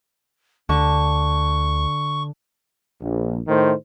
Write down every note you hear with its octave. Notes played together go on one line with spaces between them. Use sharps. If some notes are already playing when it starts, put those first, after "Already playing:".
D2 D3 C#6
A#1
A2 D#3 A3 C5